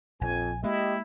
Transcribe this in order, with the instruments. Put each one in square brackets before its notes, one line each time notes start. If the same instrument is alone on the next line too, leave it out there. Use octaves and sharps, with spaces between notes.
[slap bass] A#1 [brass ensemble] F2 [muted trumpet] G#5
[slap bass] G#3 A#3 [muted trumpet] E4 [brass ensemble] G4 D#5